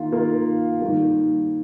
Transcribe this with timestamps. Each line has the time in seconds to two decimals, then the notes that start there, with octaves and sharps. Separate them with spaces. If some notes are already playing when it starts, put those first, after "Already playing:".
Already playing: D#3 A#3 F4
0.12 D#3 A#3 F4
0.81 D#3 G3 A#3